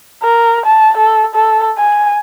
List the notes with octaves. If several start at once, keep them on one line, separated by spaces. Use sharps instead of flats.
A#4
A5
A4
A4
G#5